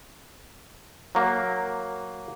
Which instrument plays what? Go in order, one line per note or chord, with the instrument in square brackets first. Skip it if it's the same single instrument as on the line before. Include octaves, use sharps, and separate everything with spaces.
[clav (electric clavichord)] F#3 A#3